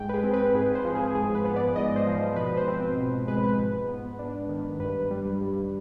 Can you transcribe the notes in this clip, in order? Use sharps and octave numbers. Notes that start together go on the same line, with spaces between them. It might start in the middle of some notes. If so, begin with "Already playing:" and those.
Already playing: G#2 G5
B4
G#4
C4
B4
G#2 G#4
C5
F3
G#4
G#2 G#4
B4
B3
D5
G#2 D#5
C5
F3
B2 B4
C5
C4
B2
G#3 B4
B4
G#2
B3
D4
D#3
G2 B4
G3
G2